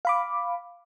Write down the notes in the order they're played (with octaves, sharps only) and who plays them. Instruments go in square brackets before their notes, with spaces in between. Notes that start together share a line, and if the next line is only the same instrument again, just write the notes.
[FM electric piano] F5 B5 D6